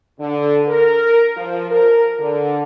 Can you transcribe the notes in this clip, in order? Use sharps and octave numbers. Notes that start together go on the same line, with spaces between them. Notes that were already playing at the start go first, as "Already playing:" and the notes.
D3
A#4
F3
A#4
D3